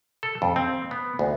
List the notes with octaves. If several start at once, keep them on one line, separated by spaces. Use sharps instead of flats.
A4
F2
C4
B3
D2